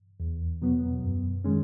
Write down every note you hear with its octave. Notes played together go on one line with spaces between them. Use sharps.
E2
B2 F#3 B3
F#2
D#3 G#3 C#4